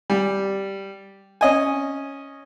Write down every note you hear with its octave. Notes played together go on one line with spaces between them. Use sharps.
G3
C#4 D#5 G#5